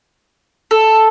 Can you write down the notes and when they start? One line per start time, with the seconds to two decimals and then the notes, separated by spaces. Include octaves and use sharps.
0.71 A4